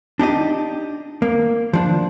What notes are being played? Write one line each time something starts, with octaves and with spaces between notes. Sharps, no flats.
D4 D#4 G4 D#5
A#3
F3 D4